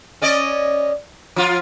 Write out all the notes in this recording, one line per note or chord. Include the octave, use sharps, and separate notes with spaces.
C#4 D5 D#5
F3 F4